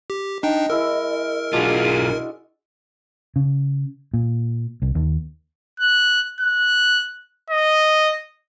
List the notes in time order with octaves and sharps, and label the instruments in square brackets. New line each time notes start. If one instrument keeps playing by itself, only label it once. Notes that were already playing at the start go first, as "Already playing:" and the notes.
[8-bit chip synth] G4
[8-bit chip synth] D4 D#4 G5 [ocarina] D#5
[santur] G#3 E4 E6 [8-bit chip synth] A#4
[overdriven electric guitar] B1 F4 [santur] G#3 D4 F#4 [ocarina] G#4
[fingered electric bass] C#3
A#2
C2
D#2
[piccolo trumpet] F#6
F#6
D#5